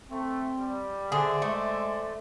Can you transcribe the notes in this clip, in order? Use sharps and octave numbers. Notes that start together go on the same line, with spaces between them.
A3 C4
G3
D3 G#4 C5 D5 E5
G#3 A3